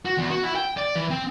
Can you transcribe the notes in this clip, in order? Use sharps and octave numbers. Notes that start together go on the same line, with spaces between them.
F#4
E2
F#4
E4
G5
D5
E3
C4